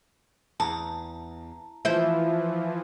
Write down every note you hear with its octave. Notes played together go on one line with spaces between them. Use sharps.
E2 A5 A#5
E3 F3 E4 C5